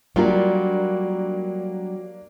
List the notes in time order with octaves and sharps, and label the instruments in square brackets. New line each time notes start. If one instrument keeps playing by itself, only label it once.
[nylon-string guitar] F#3 G3 F4 [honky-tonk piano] A#3 D4 A#4